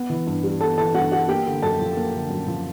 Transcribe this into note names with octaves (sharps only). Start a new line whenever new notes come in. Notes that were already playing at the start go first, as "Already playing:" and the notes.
Already playing: B3
E3
G2
G3
B3 A4 A5
E3 A4 A5
G2 F#4 F#5
G3 F#4 F#5
A#3 G4 G5
D3
F#2 A4 A5
F3
A#3
D3
F#2
F3